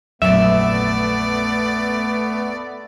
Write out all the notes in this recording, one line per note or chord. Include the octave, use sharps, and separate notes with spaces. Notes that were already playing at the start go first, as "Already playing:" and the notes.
A#1 F2 F#3 A3 B3 D5 E5